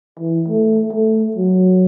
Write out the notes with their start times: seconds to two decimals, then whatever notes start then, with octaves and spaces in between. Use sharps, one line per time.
0.20 E3
0.48 A3
0.92 A3
1.37 F#3